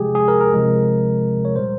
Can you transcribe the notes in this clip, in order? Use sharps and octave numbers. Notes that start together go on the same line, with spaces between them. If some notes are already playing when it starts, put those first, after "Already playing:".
Already playing: C3 F3 G#3 G4 G#4
G#4
A#4
A#4
C3 F3 G#3
C#5
A#2 G3 C5